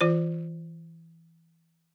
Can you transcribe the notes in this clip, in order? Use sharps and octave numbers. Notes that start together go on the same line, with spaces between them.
E3 F4 C5